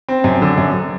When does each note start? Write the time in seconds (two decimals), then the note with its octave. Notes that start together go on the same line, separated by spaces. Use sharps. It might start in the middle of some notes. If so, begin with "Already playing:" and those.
0.09 C4
0.24 F#2
0.42 D3
0.58 F#2